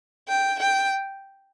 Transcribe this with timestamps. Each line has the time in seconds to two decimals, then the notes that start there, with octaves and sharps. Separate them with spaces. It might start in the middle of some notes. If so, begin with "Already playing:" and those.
0.28 G5
0.60 G5